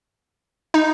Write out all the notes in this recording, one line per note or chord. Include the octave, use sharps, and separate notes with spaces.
D#4